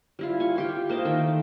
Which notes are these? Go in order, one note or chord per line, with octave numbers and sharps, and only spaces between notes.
G3 E4 F4
G#5 C#6
F4 G4 G5
A#3 C5 D#5 A5
D#3 A3 G5